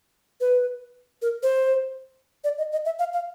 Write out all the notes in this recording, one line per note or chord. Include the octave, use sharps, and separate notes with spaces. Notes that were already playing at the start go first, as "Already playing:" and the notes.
B4
A#4
C5
D5
D#5
D#5
E5
F5
F5